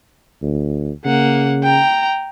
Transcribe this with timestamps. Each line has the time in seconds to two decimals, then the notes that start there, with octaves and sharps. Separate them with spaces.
0.42 D2
1.05 C#3 A#3 F#5
1.63 G5 A#5